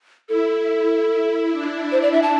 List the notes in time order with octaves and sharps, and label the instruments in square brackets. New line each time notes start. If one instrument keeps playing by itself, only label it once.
[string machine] E4 [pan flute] A4
[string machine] D4
[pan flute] C5
D5
E5
A5